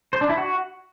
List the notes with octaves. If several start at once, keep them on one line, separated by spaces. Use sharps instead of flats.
C5
D4
E4
F#4